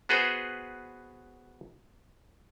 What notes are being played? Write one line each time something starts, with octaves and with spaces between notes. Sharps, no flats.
B3 F#4 G#4 B4 C5